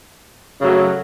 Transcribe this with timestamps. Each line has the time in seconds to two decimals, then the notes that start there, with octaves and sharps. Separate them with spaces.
0.60 F#2 C#3 F#3 A3